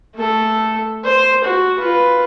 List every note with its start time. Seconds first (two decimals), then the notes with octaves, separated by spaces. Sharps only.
0.16 A3 A4
1.04 C5
1.44 F#4
1.78 F4 B4